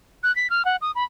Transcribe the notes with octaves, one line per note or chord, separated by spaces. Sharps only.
F#6
B6
F6
F#5
D#6
B5